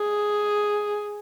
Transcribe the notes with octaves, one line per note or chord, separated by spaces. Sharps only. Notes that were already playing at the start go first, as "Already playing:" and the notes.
Already playing: G#4